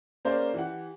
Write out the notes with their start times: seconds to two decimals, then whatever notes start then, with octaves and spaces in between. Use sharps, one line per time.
0.25 A#3 C#4 G#4 C5 D5
0.54 E3 G4 F#5